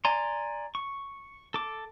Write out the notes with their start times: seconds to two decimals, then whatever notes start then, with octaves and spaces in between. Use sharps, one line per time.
0.05 D5 G#5 A#5 C6
0.75 C#6
1.54 A4 D6